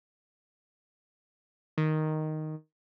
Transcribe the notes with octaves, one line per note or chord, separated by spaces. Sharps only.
D#3